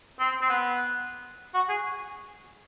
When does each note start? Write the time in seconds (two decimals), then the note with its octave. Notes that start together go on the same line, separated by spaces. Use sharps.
0.20 C4
0.42 C4
0.49 B3
1.54 F#4
1.69 G#4